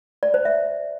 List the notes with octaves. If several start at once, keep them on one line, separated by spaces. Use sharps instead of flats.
D5
C5
E5